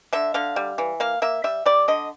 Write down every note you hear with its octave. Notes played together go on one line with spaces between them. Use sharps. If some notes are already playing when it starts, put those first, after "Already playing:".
D3 E5
D3 F5
G3
E3
A#3 F5
A#3 E5
G3 E5
G3 D5
D3 D#5